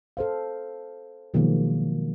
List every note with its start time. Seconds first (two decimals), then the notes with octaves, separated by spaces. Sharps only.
0.17 A4 C5 F5
1.34 B2 D#3 F3 F#3 G#3 A#3